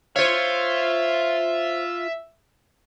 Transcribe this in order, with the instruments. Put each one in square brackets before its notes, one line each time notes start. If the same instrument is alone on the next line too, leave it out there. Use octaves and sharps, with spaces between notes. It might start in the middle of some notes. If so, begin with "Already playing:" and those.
[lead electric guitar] F4 F5 [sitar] C5 C#5 [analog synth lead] E5